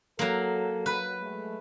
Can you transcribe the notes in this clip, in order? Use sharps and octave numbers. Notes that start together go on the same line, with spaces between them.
F#3 A#3 A4
B4
G#3 A3